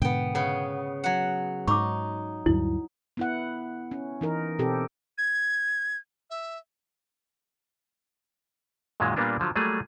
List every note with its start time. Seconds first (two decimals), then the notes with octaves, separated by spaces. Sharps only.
0.02 G#2 B2 D3 B3 G5
0.35 C#3 B3
1.04 F#3 F#5
1.67 G#2 D#4 C#6 D6
2.46 D2 G2 F#3 E4
3.17 B3 E4 F#5
3.91 C#4
4.21 E3 D#4 A#4
4.59 B2 C4 G4 A4
5.18 G#6
6.30 E5
9.00 F#2 A#2 D#3 F#3 G#3
9.16 A#2 G3 A#3 B3 D4 F4
9.40 D3 F3 F#3
9.56 F#3 G3 A3 A#3 G#4